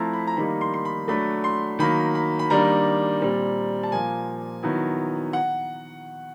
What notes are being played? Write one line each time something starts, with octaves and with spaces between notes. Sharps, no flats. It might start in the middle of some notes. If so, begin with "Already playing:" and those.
Already playing: F3 A3 C4 E4 A5 A#5
B5
A#5
D#3 G3 A#3 D#4 B5
C6
C6
B5
F#3 A3 D4 B5
C6
D#3 F#3 A#3 B5
B5
B5
D#3 G3 A#3 D4 A#5
A#2 G3 C4
A5
A#2 F3 A#3 G#5
D#3 F#3 B3 E4
F#5